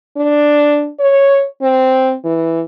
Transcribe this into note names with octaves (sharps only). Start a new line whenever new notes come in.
D4
C#5
C4
E3